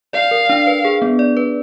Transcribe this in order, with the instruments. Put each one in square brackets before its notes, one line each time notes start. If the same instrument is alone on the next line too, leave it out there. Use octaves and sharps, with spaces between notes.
[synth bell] D5 [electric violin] F5
[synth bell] A#4
D4
B4
G#4
B3
D5
B4